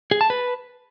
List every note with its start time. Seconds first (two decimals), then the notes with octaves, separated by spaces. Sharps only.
0.11 G#4
0.21 A5
0.30 B4